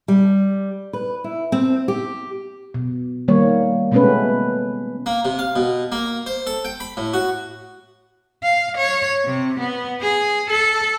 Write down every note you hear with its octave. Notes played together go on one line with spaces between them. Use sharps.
G3
B4
E4
C4
G4
B2
D#3 G3 A#3 C#5
B2 G#3 A3 B3 C#4 B4
A#3
C3
F5
B2
A#3
C5
A4
G5
B5
A2
F#4
F5
C#5
C3
B3
G#4
A4